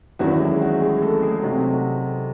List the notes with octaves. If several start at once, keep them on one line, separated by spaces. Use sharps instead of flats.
E2 D#3 F#3 C#4 E4 F#4
G#3 G#4
F#4
G#3 G#4
A3 A4
A4
G#3 G#4
C3 F#3 A3 D#4 F#4
F#4